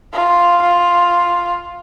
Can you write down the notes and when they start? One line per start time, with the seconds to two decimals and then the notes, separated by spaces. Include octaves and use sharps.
0.13 F4
0.62 F4